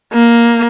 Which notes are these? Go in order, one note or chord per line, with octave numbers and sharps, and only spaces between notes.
A#3